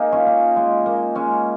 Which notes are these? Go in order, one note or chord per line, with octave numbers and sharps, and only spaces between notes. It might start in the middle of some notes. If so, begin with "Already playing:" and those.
Already playing: A#3 D#4 G#4
C#4 F4
A#3
G#3
A#3
G#3 C#4